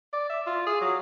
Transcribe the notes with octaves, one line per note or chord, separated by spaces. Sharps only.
D5
E5
F4
G#4
F#3